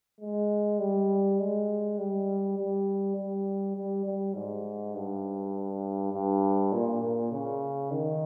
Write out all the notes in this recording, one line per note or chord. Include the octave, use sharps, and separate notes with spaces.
G#3
G3
G#3
G3
G3
G3
G3
G3
G#2
G2
G2
A#2
A#2
C#3
D#3